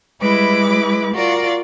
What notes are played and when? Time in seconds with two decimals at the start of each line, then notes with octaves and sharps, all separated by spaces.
0.21 G3 G#3 E4 B4 D6
1.14 F4 F#4 A#4 D5